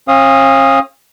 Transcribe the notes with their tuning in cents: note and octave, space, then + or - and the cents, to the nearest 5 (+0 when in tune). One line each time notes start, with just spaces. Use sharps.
C#4 -45 F5 +0 D#6 +0